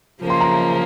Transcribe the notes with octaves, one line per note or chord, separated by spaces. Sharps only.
C#3 F3 A#3
C6
A#5